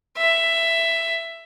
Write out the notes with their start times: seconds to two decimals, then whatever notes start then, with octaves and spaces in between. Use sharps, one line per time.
0.18 E5